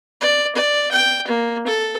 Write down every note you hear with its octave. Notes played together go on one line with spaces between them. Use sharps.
D5
D5
G5
A#3
A4